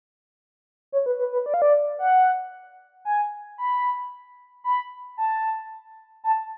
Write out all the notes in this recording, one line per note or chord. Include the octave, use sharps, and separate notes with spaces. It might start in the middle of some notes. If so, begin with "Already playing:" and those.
C#5
B4
B4
B4
D5
F5
D5
F#5
G#5
B5
B5
A5
A5